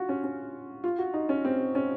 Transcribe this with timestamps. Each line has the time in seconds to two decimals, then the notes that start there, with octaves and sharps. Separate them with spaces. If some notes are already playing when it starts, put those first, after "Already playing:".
Already playing: F4 F#4
0.09 C#4
0.24 C#4
0.84 F4
0.98 F#4
1.14 D#4
1.29 C#4
1.45 C4
1.75 C#4